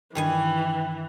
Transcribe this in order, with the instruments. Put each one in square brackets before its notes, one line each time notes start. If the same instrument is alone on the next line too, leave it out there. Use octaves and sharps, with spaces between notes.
[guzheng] G2 D#3 G#5 [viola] E3 [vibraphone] G5